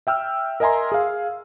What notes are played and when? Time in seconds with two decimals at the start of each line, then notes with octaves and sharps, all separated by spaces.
0.07 E5 G5 E6 F6
0.60 A#4 D#5 E5 G#5 A#5 C6
0.92 G#4 F5